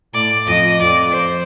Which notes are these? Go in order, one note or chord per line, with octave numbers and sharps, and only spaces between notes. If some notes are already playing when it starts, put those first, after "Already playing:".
A2 D5
F2 D#5
F2 D5
C5